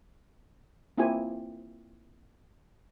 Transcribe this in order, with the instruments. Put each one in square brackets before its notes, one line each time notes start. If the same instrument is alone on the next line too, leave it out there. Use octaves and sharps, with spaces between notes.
[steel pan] A#3 C4 E4 F4 G4 G#5